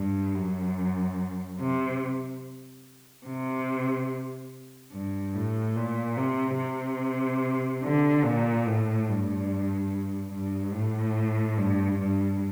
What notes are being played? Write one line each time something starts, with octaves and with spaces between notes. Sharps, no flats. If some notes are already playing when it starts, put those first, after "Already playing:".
Already playing: G2
F#2
C3
C3
G2
A2
A#2
C3
C3
D3
A#2
A2
G2
G2
A2
G2
G2